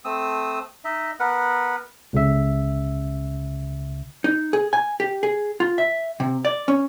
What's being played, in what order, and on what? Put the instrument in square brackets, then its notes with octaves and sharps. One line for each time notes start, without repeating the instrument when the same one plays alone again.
[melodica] A3 C4 D#6 E6
D#4 D#5 E5
B3 A#4 B4 F#5
[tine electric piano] C#2 C#3 E5
[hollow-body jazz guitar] D#4
G#4
G#5
G4
G#4
F4
E5
C3
D5
C#4